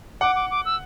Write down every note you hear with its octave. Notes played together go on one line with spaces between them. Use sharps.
F#5 D6
D6
D6
E6